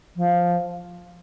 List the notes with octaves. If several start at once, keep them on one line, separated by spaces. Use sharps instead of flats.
F3